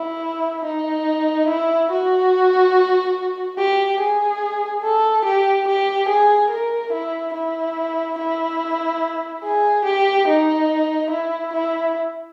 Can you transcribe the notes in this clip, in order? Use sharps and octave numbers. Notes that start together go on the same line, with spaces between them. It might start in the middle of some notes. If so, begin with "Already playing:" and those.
Already playing: E4
D#4
E4
F#4
G4
G#4
A4
G4
G4
G#4
A#4
E4
E4
E4
G#4
G4
D#4
E4
E4